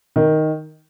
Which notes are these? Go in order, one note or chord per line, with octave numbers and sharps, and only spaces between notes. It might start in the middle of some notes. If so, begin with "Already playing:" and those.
D#3